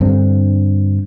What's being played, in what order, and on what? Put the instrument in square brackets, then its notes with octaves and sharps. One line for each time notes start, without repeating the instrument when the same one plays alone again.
[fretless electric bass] G2 D3 C4